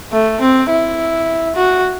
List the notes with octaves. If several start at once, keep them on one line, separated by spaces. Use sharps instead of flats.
A3
C4
E4
F#4